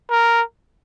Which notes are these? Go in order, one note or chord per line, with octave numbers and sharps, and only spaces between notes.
A#4